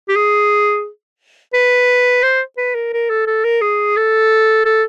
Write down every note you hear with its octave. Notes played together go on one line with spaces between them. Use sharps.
G4
G#4
B4
C5
B4
A#4
A#4
A4
A4
A#4
G#4
A4
A4